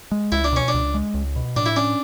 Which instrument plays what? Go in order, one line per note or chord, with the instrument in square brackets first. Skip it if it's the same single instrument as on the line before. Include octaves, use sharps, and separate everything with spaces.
[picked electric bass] G#3
[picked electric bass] C#2 [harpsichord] E4
[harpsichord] D4
[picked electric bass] B2 [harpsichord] C#4
[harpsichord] D4
[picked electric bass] C#2
G#3
C#2
B2
[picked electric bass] A2 [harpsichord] D4
[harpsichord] E4
[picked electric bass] C#4 [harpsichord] D4